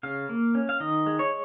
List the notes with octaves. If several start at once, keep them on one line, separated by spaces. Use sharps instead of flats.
C#3 F5
A#3
C#4
F5
D#3 D#5
G#3
C#5